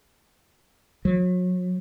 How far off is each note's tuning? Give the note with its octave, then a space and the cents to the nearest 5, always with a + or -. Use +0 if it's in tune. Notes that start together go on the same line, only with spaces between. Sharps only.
F#3 -35